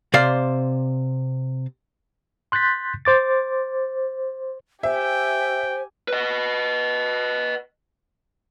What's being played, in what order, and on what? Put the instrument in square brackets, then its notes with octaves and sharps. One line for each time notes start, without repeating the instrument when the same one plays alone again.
[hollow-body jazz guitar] C3 C5 D5 F5
[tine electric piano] C6 F#6 G6 A6 B6
C5 D6 A6
[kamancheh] G4 G#5 [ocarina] C5 [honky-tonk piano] E5 [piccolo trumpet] G5
[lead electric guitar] B4 D#5